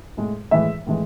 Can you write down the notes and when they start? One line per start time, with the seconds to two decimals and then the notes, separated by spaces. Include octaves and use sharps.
0.17 A2 G#3
0.51 A2 E3 G#3 E5
0.87 A2 E3 G#3